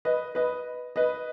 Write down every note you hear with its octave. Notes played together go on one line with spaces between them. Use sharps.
B4 D#5
B4 D#5
B4 D#5